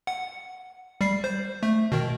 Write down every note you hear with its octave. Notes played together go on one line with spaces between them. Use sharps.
F#5
G3 C7
C5
A3
B2 D#3